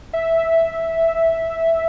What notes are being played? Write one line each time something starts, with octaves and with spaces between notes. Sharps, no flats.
E5